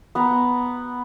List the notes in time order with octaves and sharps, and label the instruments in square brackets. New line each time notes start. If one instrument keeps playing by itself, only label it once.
[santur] B3 F#5 A#5